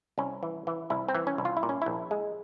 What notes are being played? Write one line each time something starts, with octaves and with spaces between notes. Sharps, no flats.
C2 C#4
E3
E3
C2 E4
C4
E3
C#4
C2
F4
E4
A#2
C#4
A#1 E4
G#3